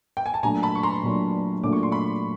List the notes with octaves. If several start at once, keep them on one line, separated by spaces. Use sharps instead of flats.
G5
G#5
A5
A#2 F#3 A3 D4 G#5 A#5
A5 B5
C#6
A#5 C6
A#2 F#3 A3 D4
A#2 F#3 A3 D4 D6
C#6
C6
B5 C#6